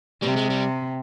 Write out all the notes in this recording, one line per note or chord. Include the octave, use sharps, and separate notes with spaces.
C3 G3
G#3
G3